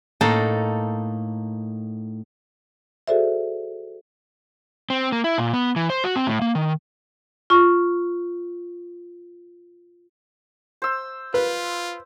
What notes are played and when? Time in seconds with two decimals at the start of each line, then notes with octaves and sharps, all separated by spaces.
0.21 A2 A#3 D#4 A4 A5
3.08 F#4 G#4 A4 C5 D5 E5
4.90 C4
5.12 A#3
5.24 E4
5.38 A#2
5.53 B3
5.76 E3
5.90 C5
6.04 F#4
6.16 C4
6.27 A2
6.41 A#3
6.55 D#3
7.50 F4 C#6
10.82 C5 E6
11.34 F4 B4